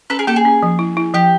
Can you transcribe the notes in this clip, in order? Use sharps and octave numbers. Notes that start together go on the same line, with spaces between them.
C#4 A4 B4
G#4 A#4
A#3 G4 A4
G#4
C#4
F3
E4
E4
F3 G4